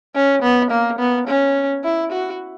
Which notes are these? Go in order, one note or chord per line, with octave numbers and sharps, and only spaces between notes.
C#4
B3
A#3
B3
C#4
E4
F#4